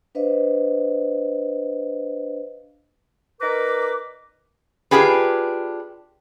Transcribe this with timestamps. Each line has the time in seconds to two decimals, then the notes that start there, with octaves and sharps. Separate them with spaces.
0.15 D4 B4 C5 D#5 F5
3.41 D#4 A#4 B4 D5 A#5 D6
4.91 D4 F4 G4 G#4 B4